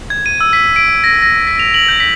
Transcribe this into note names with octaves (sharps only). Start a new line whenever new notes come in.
G#6
D#7
E6
B6
D7
A#6
A#6
B6
F7
F#7
G6
B6